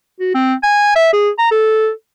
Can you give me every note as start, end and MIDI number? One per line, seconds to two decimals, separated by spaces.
0.20 0.30 66
0.35 0.54 60
0.63 0.94 80
0.96 1.09 76
1.13 1.30 68
1.39 1.51 82
1.51 1.90 69